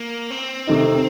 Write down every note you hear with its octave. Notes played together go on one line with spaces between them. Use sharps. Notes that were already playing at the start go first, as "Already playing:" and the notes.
Already playing: A#3
C4
C3 D#3 A3 D#4